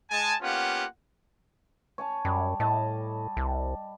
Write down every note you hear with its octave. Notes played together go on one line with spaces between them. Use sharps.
G#3 G#5 A5
A#3 B3 C#4 F4 G4 F#5
C#5 G#5 A5
F#2 G3
A2 D#5 A5
C2